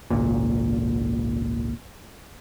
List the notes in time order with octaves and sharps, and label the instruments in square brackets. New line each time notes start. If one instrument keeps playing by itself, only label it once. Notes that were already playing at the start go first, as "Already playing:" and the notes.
[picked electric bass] G#1 C#2 A#2